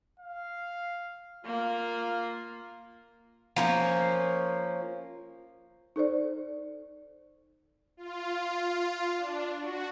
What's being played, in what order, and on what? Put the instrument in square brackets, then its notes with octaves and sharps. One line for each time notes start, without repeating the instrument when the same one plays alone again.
[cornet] F5
[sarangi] A#3 [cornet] F4
[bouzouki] F3 A#3 C#4
[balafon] D#4 A4 C5 D5
[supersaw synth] F4
D4
F#4